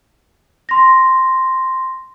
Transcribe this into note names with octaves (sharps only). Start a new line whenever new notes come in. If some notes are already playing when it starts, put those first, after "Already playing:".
C6 A#6